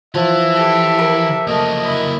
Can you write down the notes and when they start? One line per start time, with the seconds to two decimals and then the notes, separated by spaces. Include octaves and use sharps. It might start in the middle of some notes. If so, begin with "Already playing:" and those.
0.15 E3 F3 E5
0.54 G4 A4
0.99 A#4
1.47 F#3 A3 A#3 D#5
1.83 E4